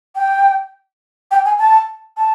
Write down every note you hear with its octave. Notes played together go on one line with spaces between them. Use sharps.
G5
G5
G#5
A5
A5